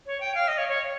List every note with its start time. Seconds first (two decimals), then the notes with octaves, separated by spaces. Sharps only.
0.06 C#5
0.20 G5
0.35 F5
0.48 D#5
0.58 C#5
0.68 C#5